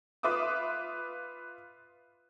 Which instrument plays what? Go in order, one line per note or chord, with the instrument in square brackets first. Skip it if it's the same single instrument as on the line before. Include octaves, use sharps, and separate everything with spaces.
[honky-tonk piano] F4 B4 E5 D6 D#6